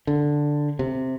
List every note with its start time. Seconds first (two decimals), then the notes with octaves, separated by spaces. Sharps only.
0.07 D3
0.79 C3